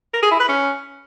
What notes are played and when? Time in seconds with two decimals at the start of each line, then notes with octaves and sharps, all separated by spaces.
0.14 A#4
0.22 G#4
0.31 E4
0.40 B4
0.49 C#4